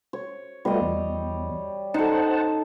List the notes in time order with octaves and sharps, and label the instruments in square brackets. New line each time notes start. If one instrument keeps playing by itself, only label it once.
[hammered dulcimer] C#5
[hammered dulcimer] G3 D#5 [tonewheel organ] A3 B3 F4
[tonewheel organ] E2
[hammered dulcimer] D#4 A4 [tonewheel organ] C5 F#5 A5